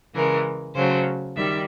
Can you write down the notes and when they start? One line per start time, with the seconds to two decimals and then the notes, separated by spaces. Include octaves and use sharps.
0.14 C#3 E3 G#3 A#4
0.75 C#3 F#3 A3 C5
1.36 D#3 G3 E5